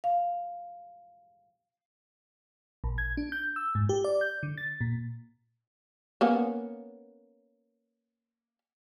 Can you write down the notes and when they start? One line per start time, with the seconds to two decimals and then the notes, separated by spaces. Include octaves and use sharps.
0.04 F5
2.84 A#1
2.98 G#6
3.17 D4
3.32 G6
3.56 E6
3.75 G#2
3.89 G4
4.04 D5
4.21 G6
4.43 D3
4.58 A6
4.81 A#2
6.21 A#3 B3 C#4